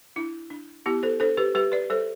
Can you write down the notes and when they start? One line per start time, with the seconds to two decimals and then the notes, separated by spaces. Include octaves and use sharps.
0.16 D4 E4
0.50 D4
0.86 B3 E4 G4
1.03 A4 C5
1.20 D4 A4 C5
1.37 G4 B4
1.55 G3 G4 B4
1.72 B4 D5
1.90 G3 A4 C5